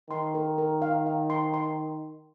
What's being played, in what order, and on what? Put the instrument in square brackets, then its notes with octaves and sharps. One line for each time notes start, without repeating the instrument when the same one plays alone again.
[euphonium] D#3 [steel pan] C6
[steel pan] A#4
A#4
F5
F5
C6
C6